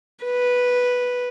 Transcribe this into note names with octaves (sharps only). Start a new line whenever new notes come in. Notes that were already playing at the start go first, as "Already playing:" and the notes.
B4